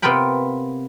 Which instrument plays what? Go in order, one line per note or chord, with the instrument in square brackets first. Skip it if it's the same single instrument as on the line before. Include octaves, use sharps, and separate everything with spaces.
[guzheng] C3 B3 F4 A#4 G5 B5